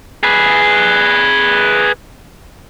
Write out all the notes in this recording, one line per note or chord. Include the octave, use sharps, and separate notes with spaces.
G#4 B4